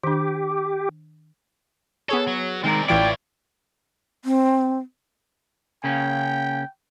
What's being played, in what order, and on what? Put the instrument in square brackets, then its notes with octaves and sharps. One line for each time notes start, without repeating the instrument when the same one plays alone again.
[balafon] D#3 D4 [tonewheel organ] G4
[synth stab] B3 G#4 C#5 [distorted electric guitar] A4
[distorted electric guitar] F#3
[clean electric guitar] D#3 G#3 A#4 [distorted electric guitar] C4 D5
[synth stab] A1 E3 D7 [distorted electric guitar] E4 C#5 [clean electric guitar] F4 D5 [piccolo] G5
[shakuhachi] C4
[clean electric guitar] C#3 A#3 C#4 [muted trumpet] G5